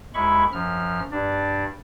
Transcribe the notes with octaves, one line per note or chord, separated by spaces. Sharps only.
D#2 G#3 E4 B5 C#6
F#2 F3 F6
G2 D4 D5